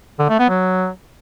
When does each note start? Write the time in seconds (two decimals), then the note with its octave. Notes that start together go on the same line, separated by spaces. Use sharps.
0.19 D3
0.29 A3
0.39 B3
0.49 F#3